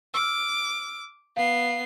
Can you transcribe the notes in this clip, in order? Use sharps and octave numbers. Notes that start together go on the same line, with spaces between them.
D6 E6 F6
B3 F5 C7